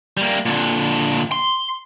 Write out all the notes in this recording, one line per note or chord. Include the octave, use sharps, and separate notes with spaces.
G3 A#3
A#2 D3
C6